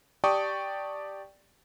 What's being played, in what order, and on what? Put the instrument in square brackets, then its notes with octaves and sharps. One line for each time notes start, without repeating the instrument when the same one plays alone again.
[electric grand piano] G4 D5 G5 A5 C#6 D#6